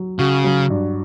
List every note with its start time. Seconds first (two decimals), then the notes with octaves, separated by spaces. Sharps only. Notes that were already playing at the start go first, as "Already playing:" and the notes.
Already playing: F#3
0.19 C#3 F#4
0.44 F#3
0.70 G2